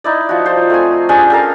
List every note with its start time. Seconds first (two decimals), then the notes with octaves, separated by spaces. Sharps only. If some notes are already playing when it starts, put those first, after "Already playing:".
0.04 D#4 E4 D5
0.29 F3 F#4
0.46 C5 A5
0.70 A3 C4 G#5
1.09 C#4 D4 G4 G#4
1.30 G4 A4 A#4 F5